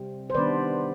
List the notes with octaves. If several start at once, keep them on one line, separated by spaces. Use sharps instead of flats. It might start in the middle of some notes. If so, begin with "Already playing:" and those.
Already playing: C3 G3 C4
C5
D#3 G3 B3 D4 B4 D5